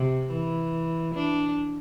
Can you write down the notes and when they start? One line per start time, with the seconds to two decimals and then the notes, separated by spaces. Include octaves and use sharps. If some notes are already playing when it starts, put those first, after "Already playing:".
Already playing: C3
0.31 E3
1.14 D4